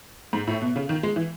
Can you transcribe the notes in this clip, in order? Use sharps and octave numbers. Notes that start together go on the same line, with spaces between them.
G#2
A2
B2
C#3
D#3
G#3
E3